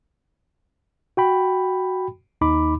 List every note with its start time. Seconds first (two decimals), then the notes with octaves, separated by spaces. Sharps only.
1.17 F#4 G5 B5
2.41 D#2 D#4 B5 D6